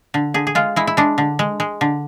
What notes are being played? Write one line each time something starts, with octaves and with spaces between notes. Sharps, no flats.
D3
D3 G#4
G#4
G#3 F4
G#3 E4
E4
G#3 D4
D3
G#3
G#3
D3